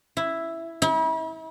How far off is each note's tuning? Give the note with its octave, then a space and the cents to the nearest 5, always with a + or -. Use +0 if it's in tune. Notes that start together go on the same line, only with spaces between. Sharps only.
E4 +5
E4 -40